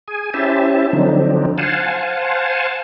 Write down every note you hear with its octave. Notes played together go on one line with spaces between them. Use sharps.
G#4 G#5
C#4 E4 G4 C5 E5 A5
D3 F3 F#3 C4 D4 D#4
C5 F5 F#5 G#5 A5